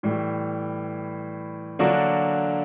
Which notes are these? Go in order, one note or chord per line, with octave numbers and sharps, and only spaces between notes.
A2 E3 G3
D3 F#3 A#3 D4 F#4